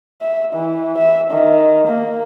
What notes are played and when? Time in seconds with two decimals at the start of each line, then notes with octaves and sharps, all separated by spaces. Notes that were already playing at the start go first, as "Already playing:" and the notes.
0.21 E5
0.53 E3
0.97 E5
1.31 D#3
1.87 A#3